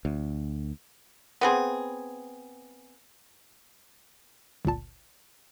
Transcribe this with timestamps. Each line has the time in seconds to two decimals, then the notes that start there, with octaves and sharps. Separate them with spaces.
0.05 D2
1.41 B3 C4 G#4
4.65 G1 C#2 A#2 A5